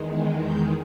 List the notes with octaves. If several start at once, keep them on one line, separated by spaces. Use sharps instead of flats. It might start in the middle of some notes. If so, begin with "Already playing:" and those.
Already playing: E2 D#3 G#3
G6